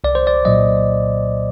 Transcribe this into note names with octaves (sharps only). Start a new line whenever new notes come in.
C2 D5
C5
D5
A#2 F#3 D#5